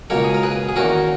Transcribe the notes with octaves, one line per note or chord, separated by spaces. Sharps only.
C#2 B2 A#3 A#4 C#5
G#4
A#4
G#4 B4
G#4
E2 D#3 A#3 C#4 F#4 A#4